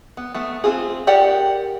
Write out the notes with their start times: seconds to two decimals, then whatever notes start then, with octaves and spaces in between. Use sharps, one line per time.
0.17 B3
0.34 A3 B3
0.64 C4 F4 G#4
1.07 G4 A#4 D5 F#5